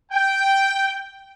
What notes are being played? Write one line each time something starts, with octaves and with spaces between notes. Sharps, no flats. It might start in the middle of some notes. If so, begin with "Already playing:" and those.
G5